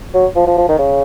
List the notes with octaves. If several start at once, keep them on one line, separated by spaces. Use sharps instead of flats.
F#3
F3
F3
F3
D#3
C#3